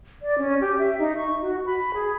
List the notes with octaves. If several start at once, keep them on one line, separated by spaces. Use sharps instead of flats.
D5
C#4
G4
E5
D#4
C#6
F#4
B5
G#4